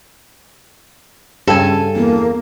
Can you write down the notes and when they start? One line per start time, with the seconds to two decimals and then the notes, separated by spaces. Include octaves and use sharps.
1.48 G2 C#3 A4 G#5
1.96 E2 A#3